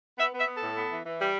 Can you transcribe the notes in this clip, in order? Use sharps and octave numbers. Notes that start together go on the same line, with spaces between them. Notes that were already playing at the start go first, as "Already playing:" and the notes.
B3 E5
B3 E5
B3
A4
A2
B3
E3
E3
G3